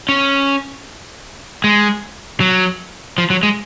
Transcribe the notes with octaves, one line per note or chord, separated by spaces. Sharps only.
C#4
G#3
F#3
F3
F#3
G#3